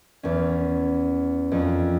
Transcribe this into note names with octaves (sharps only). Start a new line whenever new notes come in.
E2 C#4
F2 C#4